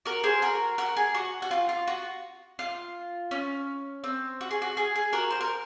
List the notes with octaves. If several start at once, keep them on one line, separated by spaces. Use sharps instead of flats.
F#4 A#4
G#4 C5
F#4 A#4
F#4 A#4
G#4
F#4
F#4
F4
F4
F#4
F4
C#4
C4
F#4
G#4
F#4
G#4
G#4
F#4 A#4
C5
A#4